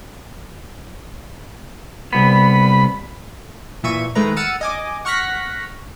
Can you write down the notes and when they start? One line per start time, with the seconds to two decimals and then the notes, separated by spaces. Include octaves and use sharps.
2.13 C2 B3 B5
3.83 A#2 E3 E5 C#6 D#7
4.15 D#3 G#3 A3 B4 A#5
4.36 F#5 E6 F6 A6 C#7 D#7
4.61 D#5 G#5 D6
5.05 F#5 C#6 F6 F#6 A#6 B6